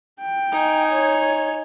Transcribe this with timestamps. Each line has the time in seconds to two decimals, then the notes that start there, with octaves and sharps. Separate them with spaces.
0.20 G5
0.52 D#4 G#5
0.92 C#5